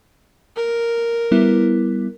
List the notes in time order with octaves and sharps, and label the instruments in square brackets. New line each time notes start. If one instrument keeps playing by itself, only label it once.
[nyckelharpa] A#4
[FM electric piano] G3 B3 E4